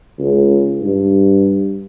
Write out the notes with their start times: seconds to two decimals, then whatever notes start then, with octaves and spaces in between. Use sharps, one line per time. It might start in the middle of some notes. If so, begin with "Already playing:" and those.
0.19 C#2
0.82 G2